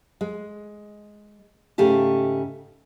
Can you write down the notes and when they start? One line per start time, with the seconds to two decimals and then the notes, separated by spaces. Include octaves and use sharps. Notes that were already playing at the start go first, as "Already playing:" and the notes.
0.21 G#3
1.78 G#2 C#3 A3 G4 A5